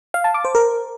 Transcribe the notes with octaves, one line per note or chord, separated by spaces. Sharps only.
F5
A5
D6
C5
A#4